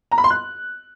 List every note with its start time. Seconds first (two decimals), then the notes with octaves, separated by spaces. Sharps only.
0.12 A#5
0.18 B5
0.24 C6
0.30 F#6